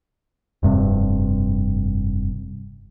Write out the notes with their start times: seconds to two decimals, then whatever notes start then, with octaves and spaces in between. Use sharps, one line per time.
0.63 F1 G2 C3